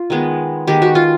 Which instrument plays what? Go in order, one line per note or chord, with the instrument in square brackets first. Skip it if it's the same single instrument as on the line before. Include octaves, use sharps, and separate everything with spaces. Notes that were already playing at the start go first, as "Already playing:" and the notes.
Already playing: [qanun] F4
D#3 G#3 B3
D#3 G#3 B3 G4
F#4
F4